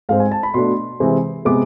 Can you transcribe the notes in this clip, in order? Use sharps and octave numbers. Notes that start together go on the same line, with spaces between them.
G#2 G#3 C4 F5
G#5
A5
B5
B2 A3 D4 C6
C3 E3 G#3 C4
C3 G#3 B3 D6